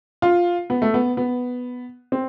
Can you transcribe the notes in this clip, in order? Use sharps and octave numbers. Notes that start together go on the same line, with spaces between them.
F4
B3
A3
B3
B3
C4